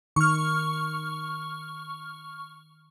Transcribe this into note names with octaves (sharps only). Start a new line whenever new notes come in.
D#3 C#6 F6